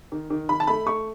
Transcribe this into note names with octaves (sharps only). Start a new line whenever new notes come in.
D#3
D#3
D#3 B5
A5
A3 B5
A3 C#6